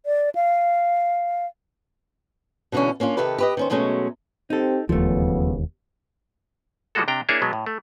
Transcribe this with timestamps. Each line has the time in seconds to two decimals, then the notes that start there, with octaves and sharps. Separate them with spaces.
0.06 D5
0.35 F5
2.72 B2 D3 E3 A3 C#4
3.00 A#3 C#4 D4 F4
3.17 C3 D#3 G4 A4 B4
3.38 G4 B4 D#5
3.57 D#3 C#4 C5
3.70 B2 F#3 G#3 A3 C#4
4.50 C4 D#4 G4 A4
4.89 E1 D#2 C#3 F3 A3 B3
6.95 E3 F3 G3 G#3 F#4 A4
7.08 C3 D4 G5 A#5
7.29 A#3 D4 E4 G#4 C#5 E5
7.42 B2 F#3 G#3 B3
7.53 A2
7.66 A3